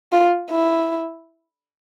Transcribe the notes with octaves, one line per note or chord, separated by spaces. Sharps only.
F4
E4